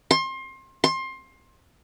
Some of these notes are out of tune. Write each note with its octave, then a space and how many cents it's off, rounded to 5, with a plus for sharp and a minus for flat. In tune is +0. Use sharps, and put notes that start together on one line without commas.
C6 +30
C6 +25